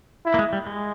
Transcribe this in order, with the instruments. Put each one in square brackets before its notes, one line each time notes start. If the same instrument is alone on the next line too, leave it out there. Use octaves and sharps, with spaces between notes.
[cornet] E4
[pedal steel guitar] A#3
G#3
G3
G#3